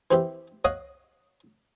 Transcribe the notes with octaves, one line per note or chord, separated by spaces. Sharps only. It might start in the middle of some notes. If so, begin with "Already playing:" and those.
E3 C4 G4 E5
C#5 D#5 F5 F#5 D#6